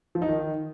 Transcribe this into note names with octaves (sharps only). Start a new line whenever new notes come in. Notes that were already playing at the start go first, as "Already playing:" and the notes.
F3
D#4
D#3